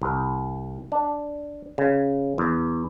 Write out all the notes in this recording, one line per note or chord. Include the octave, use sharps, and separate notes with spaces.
C2
D4
C#3
E2